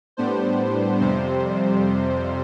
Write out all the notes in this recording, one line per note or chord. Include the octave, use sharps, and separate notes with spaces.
A2 G3 B3 D4 C5
F2 C3 G3 C5